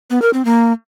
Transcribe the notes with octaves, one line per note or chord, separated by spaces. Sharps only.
B3
A#4
C4
A#3